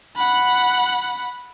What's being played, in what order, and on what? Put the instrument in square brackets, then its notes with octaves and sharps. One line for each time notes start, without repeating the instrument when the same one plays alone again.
[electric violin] F#5 B5